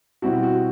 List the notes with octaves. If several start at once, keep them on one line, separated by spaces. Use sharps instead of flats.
B2 G3 C4 E4 F#4
F#4